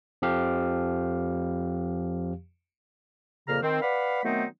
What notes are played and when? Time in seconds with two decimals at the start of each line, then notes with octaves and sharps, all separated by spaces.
0.22 F2 F3 G4 F5
3.48 F2 A#2 C#3 A#3 A#5 F6
3.62 D#3 C4
3.82 B4 D5 F5 F#5 B5
4.24 D#3 F#3 A3 B3 C4 D#4